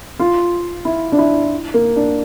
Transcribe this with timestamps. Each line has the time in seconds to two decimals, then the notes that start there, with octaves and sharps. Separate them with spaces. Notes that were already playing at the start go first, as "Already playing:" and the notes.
0.19 F4
0.85 E4
1.12 D4
1.18 E4
1.74 A#3
1.96 D4